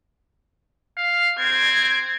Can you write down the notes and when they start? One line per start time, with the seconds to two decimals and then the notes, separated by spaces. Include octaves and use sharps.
0.97 F5
1.39 C4 G#6